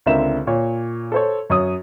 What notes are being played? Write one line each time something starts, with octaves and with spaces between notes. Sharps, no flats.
C#2 D3 C4 A#4 E5 E7
A#2 C#5
A4 C5 C#5
F#2 C#5 D#6